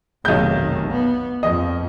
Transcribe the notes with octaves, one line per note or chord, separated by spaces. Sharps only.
F1 B1 D#3 G6
B3
F2 F3 D#5